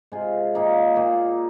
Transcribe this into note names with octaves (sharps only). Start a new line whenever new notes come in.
C3 G#3 F4 G#4
A#2 A#3 D#4 G#4
A#2 A#3 D#4 G#4